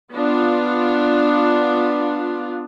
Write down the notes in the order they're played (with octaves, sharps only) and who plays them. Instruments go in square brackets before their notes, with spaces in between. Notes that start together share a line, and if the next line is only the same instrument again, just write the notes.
[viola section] B3 D4 F4